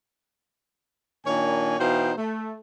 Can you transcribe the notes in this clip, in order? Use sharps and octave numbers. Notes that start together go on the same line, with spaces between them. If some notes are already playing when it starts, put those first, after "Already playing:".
A#2 D#3 D4 C#5 G#5
B2 E3 D#4 C5 F5 G5
A3